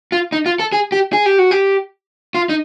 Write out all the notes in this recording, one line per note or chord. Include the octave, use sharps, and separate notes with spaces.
F4
D#4
F4
A4
G#4
G4
G#4
G4
F#4
G4
F4
D#4